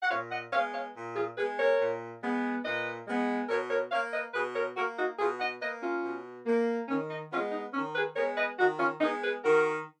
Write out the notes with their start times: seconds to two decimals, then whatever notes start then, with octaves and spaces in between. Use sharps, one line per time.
0.02 F#5
0.09 A#2 C#5 F5
0.30 D#5 F#5
0.52 G#3 C#5 F5
0.55 B3
0.73 C#5 F5
0.94 A#2
1.15 F4 G#4
1.36 G#3 B3 G#4 B4
1.58 A#4 C#5
1.79 A#2
2.22 G#3 B3
2.64 A#2 B4 D#5
3.06 G#3 B3
3.48 B2 A#4 C#5
3.70 A#4 C#5
3.91 A#3 C#5 F5
4.12 B4 D#5
4.34 B2 G#4 B4
4.55 A#4 C#5
4.76 A#3 F#4 A#4
4.97 D#4 F#4
5.18 B2 F4 G#4
5.39 D#5 F#5
5.61 A#3 B4 D#5
5.82 C#4 F4
6.03 B2
6.46 A#3
6.88 D#3 C#4
7.10 D#4
7.31 B3 C#4 F4
7.34 G#3
7.52 D#4
7.73 D#3 C#4
7.95 G#4 B4
8.16 G#3 B3 A#4 C#5
8.37 B4 D#5
8.58 D#3 D#4 F#4
8.79 C#4 F4
9.00 G#3 B3 D#4
9.22 G#4 B4
9.43 D#3 F#4 A#4